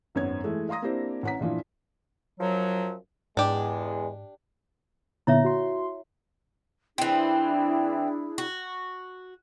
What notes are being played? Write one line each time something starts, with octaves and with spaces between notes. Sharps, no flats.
G#1 F#2 B3 C#5 G#6
E3 G#3 A3
F5 A#5 C6 D#6 A#6
A#3 C4 D4 E4 G4 C5
A1 C#4 F#5 A#5 B6
G2 A#2 E3 F3
F#2 F3 F#3
E2 G#2 G#3 D4 G4
A#2 D3 B3 E4 C#5 E5
F#4 C6
E3 C4 D4 E4 G#4
F#4